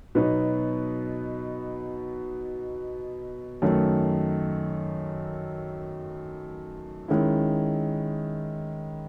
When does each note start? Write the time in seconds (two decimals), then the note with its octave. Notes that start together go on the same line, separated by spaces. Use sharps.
0.15 B2 F#3 B3 D#4
3.62 F#2 D#3 A3
7.08 D#3 G#3 C#4 E4